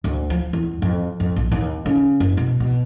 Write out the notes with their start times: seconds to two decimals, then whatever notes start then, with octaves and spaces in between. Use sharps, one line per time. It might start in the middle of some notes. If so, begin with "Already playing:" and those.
0.04 D2
0.30 F3
0.53 E2
0.82 F2
1.20 F2
1.36 A#1
1.52 D#2
1.86 C#3
2.20 F#1
2.37 B2
2.60 B2